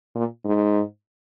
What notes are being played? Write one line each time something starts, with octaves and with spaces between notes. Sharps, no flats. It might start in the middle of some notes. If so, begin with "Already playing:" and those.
A#2
G#2